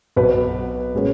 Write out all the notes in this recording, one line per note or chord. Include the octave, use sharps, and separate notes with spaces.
B1 B2 F#3 B4
A#2 G#3 C#4